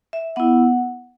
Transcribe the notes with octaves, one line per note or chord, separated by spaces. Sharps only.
E5
B3 E4 F#5